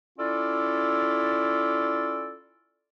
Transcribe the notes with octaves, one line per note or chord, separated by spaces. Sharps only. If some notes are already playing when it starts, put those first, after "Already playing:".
C#4 E4 F4 A4 D5